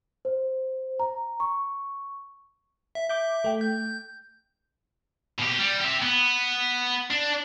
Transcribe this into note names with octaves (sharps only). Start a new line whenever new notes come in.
C5
A#5
C#6
E5
E5 D6 G6
A3 G5
G6
B2 G4
G3
G4 E5
B3
D4